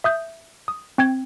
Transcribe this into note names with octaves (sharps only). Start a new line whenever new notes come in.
E5 D#6 G6
D#6
C4 G5 G#6